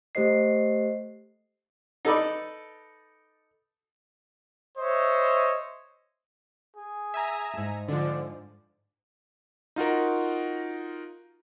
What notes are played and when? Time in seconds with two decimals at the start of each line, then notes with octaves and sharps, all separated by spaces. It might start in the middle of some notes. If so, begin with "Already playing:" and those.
0.15 A3 G4 C5 D#5 C7
2.05 D#4 A4 B4 D5
4.78 C5 C#5 D#5 E5
6.76 G#4
7.14 E5 G#5 A#5
7.54 G#2 A5
7.88 D3 F3 D5
9.76 D#4 F4 F#4 A#4